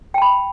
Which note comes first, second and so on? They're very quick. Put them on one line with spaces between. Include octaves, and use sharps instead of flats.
G5 A5 B5